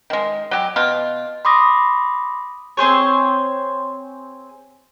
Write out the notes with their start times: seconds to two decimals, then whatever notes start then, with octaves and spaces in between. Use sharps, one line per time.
0.10 D#3 G#3
0.51 F#3 G4
0.76 B2 F4
1.45 B5 C6 D6 D#6 A#6
2.77 C4 G#4 C5 C#5